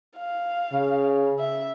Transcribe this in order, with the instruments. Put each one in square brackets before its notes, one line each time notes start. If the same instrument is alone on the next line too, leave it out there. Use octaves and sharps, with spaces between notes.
[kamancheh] F5
[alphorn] C#3
[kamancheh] E5